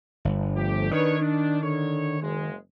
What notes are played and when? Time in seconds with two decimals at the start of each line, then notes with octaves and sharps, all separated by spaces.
0.25 G1
0.55 F3 A3 G4
0.91 D#3 D4 B4 C#5
1.20 D4
1.62 D3 D#4 C#5
2.21 F#1 G#3